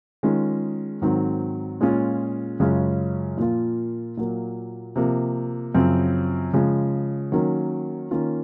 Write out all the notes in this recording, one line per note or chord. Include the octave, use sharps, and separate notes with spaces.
D#3 G#3 C#4 F4
G#2 D#3 F#3 C4
A#2 G#3 C#4 F4
F#2 C#3 G#3 C#4 F4
A#2 F3 A#3 F4
A#2 F#3 A#3
C3 F3 A#3
F#2 C#3 F3 C4
C#3 F3 G#3
D#3 F#3 A#3 C#4
D#3 A#3 C#4 F4